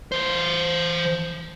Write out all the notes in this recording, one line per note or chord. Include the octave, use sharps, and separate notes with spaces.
E3 C5